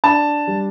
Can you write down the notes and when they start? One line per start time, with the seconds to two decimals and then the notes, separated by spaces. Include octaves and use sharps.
0.04 D4 A5
0.47 G3